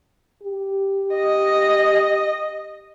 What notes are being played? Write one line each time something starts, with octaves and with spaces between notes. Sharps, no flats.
G4
D#5